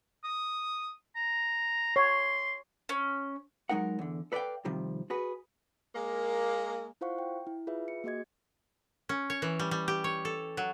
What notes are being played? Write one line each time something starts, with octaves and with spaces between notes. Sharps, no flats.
D#6
A#5
C#5 C6
C#4
F#3 G#3 D#4 A#4 F#5
E2 D3
A4 B4 D5 E5 F5 G5
C3 D#3 F3 G3
F#4 G#4 B4
G#3 A#3
E4 F4 C5 F5 F#5 C#6
G5
E4
F4 G#4 B4 E5
C#7
A#3 F#4 G#4 D#5 G#6
C#4
C#5
E3
G3
G3
G4
C#5
A4
F#3